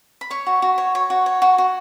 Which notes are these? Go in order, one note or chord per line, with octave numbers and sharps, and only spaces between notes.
B5
C#5 C#6
F#4
F#4
C#5
C#5
F#4
C#5
F#4
F#4